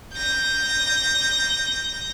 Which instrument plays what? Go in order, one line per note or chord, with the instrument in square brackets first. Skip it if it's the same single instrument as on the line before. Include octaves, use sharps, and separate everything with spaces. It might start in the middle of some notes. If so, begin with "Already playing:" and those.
[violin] G6 A#6